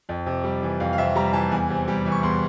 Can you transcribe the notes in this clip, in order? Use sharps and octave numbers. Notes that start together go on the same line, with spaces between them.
F2
C3
G3
E3
F2 F5
F5
C3 E5
G3 A#5
E3 A5
E2 G#5
C3
G3
E3
C#6
E2 C6